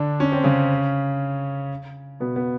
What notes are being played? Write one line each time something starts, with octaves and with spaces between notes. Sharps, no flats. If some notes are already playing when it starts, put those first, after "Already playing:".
Already playing: D3 D4
C#4
C4
C#3 C#4
B2 B3
B3